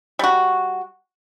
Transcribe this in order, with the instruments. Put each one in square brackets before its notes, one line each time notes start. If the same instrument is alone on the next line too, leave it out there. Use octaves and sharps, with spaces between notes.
[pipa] G3 F#4